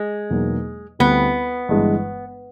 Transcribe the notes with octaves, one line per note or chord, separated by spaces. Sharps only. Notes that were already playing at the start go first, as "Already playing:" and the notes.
Already playing: G#3
E2 B2 F#3 A#3 D#4
D2 D3 G3 B3 C4 E4
G1 G2 E3 G#3